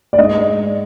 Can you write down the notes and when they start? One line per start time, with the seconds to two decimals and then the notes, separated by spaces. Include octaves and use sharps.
0.13 D5
0.18 G#2 D#5